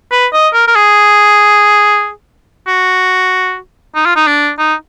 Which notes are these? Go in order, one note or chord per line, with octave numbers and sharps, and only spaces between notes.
B4
D#5
A#4
A#4
G#4
F#4
D#4
F4
D#4
D4
D#4